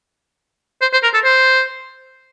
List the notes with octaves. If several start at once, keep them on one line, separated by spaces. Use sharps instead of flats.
C5
C5
A#4
A4
C5